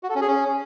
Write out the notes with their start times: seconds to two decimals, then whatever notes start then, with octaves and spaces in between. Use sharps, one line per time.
0.03 F#4
0.09 A4
0.15 C#4
0.21 G#4
0.27 C#4